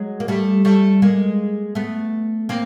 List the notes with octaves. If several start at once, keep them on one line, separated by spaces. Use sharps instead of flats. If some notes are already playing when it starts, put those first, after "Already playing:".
Already playing: F#3 G#3
A#3
G3 A3
G3 A3
G#3 A#3
A3 B3
A#3 C4